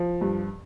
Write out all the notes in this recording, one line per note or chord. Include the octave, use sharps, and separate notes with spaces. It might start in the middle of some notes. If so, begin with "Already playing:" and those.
Already playing: F3
G2